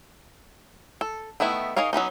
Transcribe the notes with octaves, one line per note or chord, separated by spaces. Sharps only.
A4
D#3 A3 B3 E4
D#4 G#4 A#4 C#5 F5
F#3 B3 C#4 D#4